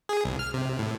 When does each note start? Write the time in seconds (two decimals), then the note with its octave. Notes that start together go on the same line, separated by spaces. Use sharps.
0.09 G#4
0.25 C2
0.39 F6
0.54 C3
0.79 A2